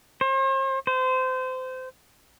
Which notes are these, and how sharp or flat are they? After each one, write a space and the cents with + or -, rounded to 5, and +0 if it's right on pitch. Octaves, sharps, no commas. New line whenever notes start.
C5 +45
C5 -25